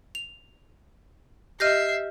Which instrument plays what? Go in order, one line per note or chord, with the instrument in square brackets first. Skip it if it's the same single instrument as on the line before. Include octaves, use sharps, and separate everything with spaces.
[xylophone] F7
[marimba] G4 D#5 [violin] E5 C7 [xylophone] F6 G6 A#6